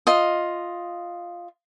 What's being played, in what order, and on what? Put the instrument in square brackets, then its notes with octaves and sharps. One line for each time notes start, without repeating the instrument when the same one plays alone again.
[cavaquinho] F4 D#5